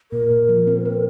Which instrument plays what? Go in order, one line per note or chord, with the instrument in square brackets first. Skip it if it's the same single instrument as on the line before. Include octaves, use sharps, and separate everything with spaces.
[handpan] A#2 [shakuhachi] A#4
[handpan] A#2
F3
C4
C4